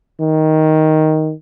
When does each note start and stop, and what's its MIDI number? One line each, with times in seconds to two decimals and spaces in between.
0.21 1.32 51